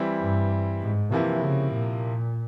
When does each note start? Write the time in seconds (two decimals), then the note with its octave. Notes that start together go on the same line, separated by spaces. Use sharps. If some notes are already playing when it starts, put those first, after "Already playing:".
Already playing: E3 G3 C4 E4
0.20 G2
0.81 G#2
1.12 C3 E3 F3 A#3 E4
1.43 C#3
1.73 A#2